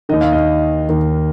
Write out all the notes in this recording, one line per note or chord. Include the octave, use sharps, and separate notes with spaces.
D#2 D#3 D#5
F5
D#5
D#2 D#3